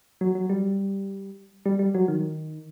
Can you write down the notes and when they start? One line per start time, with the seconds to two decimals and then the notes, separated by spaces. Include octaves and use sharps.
0.21 F#3
0.35 F#3
0.49 G3
1.66 G3
1.79 G3
1.95 F#3
2.08 D#3